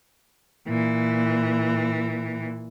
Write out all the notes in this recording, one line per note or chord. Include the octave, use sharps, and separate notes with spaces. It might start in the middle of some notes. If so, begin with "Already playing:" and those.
A#2 E3